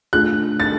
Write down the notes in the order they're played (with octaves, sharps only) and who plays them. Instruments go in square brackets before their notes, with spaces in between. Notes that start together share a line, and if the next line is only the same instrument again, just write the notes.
[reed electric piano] A3 D4 F4 G#4 [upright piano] F#6
[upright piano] A6